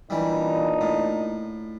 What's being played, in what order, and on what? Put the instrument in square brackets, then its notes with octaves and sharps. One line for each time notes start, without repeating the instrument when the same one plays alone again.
[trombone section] A#2 D4 D#4 [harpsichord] E3 G3
[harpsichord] A2